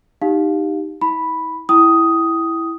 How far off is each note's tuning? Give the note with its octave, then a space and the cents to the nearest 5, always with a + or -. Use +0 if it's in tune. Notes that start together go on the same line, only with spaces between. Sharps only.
D#4 +0 G4 +0 F5 +15
E4 -40 B5 +0
E4 +0 G5 -20 D#6 +5